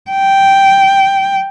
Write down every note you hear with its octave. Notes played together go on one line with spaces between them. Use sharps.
G5